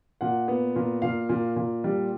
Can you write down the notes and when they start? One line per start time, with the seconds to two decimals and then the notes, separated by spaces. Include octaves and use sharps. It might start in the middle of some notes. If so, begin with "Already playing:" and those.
0.21 A#2 F#5
0.48 B3
0.76 A#2
1.02 A#2 F5
1.29 A#2
1.56 A#2
1.84 G3